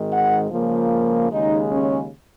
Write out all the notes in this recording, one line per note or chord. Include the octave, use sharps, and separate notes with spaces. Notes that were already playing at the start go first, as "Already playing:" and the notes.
Already playing: G#1 G#2 D#3 G#3
F#5
C#2 C#3 F3 A#3
D#2 C#3 G#3 D#4
C#4